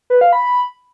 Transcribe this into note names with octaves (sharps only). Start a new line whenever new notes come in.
B4
F5
B5